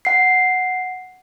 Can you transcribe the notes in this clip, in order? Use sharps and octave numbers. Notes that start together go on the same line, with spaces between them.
F#5 C7